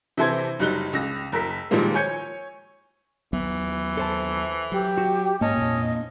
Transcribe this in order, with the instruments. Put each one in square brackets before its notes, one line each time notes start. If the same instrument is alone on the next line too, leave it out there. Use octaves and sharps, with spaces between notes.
[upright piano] C3 E3 E4 A4 C5 G#6
F#1 F#3 G3 D#4 F#6 G7
C#2 A#6
F#1 A#4 E6 B6
A#2 D#3 F3 G3 G#3 A#3
C#5 G#5 G6 G#6 C#7
[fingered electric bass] D#2 F#3 B3 [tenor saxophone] E3
[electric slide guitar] A4 C5 A5
[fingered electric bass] F#3 [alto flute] G4
[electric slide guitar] F#4
[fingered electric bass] G#2 [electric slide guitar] A#3 A5 [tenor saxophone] C#4 [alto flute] D#5
[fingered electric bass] F2 A#2